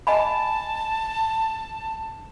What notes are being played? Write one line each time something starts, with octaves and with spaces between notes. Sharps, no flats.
D#5 G#5 A5 B5